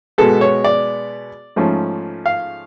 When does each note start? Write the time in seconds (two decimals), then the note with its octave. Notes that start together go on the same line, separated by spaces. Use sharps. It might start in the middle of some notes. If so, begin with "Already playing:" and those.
0.18 B2 G#3 B3 A4
0.41 C#5
0.64 D5
1.56 G#2 F3 A3 C#4
2.26 F5